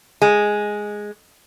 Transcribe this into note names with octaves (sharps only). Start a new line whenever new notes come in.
G#3